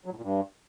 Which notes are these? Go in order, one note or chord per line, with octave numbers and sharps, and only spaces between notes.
F#3
A2
A#2
G2